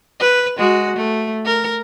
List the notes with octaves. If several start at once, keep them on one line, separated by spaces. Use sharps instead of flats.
B4
G#3 F#4
A3
A#4